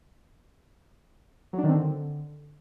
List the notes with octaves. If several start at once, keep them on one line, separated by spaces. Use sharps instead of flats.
F#3
D4
D#3
C4
D3